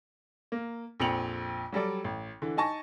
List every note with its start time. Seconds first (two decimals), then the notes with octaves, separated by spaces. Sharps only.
0.52 A#3
1.00 A#1 F2 C4 C#7 F7 F#7
1.72 F#3 G3 A4 D5
2.04 A1
2.42 D3 E3
2.57 D#4 G#5 A5 C#6 A#6